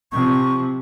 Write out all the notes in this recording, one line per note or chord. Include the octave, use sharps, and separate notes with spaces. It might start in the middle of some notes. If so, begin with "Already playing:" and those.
C3 F3 C#6